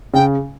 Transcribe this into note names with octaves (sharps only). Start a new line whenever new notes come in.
C#3 G5